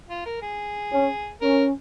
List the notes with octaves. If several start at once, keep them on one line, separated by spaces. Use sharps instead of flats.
F4
A#4
G#4
C#4
C#4 A#4